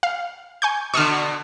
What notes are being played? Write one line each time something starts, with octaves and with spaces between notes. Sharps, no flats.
F5
G#5 C#6 G6
B2 D3 C#6 D#6 F6